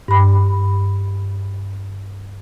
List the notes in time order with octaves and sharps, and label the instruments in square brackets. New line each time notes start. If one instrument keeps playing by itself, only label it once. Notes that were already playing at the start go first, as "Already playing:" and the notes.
[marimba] G2 B5